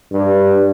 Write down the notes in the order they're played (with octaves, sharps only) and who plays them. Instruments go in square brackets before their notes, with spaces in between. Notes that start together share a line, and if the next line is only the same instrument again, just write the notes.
[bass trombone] G2